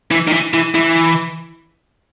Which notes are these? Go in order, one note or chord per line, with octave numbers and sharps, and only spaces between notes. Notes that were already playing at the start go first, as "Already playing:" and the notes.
E3
D#3
E3
E3
E3